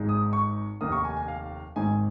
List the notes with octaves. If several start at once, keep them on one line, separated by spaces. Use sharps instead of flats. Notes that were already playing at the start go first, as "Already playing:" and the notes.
Already playing: G#1 G#2 G#3 D#4
D#6
C#6
F1 D#2 D#3 A#3 D#6
C#6
G#5
G#5
F5
G#1 G#2 D#3 G#5